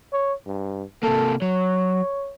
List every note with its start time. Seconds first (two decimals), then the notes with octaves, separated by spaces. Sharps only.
0.13 C#5
0.46 G2
1.03 C3 A#3 A4
1.42 F#3 C#5